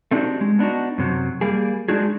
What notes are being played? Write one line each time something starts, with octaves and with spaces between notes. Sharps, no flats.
A3 C4 D4 D#4 F#4 G4
G#3
B3 D4 D#4 F#4
F#2 C3 F#3
G3 A#3 G#4
G#3 D4 D#4 F#4 G#4